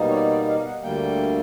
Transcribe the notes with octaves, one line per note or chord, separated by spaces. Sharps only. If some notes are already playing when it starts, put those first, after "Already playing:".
Already playing: B2 G3 A#3 D#4
C#5
D5
D5
F5
F#5
D2 D3 G3 A#3 G5